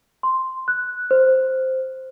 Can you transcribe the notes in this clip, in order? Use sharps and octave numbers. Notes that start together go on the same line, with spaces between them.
C6
F#6
C5